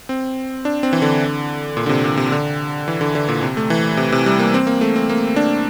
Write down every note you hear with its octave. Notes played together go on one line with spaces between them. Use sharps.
C4
D4
C4
E3
D3
A#2
D3
C3
A#2
C3
D3
E3
D3
D3
A#2
C3
A3
E3
C3
C3
G3
A#3
C4
A#3
A3
C4
A#3
D4